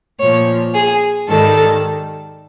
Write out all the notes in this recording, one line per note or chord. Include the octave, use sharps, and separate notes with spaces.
A#2 F3 C#5
G#4
G#2 D#3 G3 A4